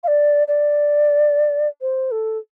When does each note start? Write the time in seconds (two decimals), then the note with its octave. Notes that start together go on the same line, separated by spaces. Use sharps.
0.04 F5
0.08 D5
0.48 D5
1.81 C5
2.11 A4